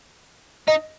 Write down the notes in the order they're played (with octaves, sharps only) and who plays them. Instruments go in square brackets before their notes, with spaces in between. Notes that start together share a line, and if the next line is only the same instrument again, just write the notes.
[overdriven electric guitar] D#4 [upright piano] D#5